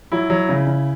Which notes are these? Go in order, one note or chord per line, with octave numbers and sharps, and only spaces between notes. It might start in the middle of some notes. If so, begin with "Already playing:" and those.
F#3 E4
F#3
C#3
C#3